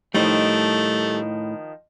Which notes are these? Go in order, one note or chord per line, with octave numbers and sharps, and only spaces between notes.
A2 D#3 F3 G3 A3 D#4 C5